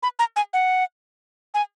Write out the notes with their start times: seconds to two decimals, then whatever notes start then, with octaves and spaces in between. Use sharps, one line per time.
0.03 B5
0.19 A#5
0.36 G#5
0.53 F#5
1.54 G#5